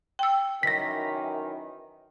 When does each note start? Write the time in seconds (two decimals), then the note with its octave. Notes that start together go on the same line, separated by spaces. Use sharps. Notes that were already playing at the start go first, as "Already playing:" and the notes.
0.19 G5 E6
0.63 F#2 D#3 E3 A#6 B6